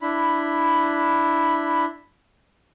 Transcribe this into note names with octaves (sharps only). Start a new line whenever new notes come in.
D4 E4 B5